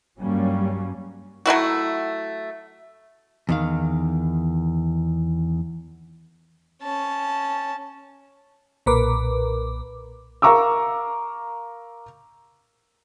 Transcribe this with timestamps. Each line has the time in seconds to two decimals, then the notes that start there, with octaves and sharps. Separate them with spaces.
0.20 G2 F#3 G3 A#3 C#4
1.46 F#3 A3 E4 F#4
3.49 E2 D#3 F5
6.82 C#4 A5
8.86 B1 A#2 A#4 B4 D6
10.42 A#4 F5 A#5 C#6 D6 E6